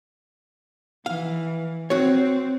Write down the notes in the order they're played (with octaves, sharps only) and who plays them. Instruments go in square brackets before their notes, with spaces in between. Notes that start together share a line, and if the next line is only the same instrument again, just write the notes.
[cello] E3 [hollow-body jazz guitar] F5
[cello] C4 [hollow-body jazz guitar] F#4 C#5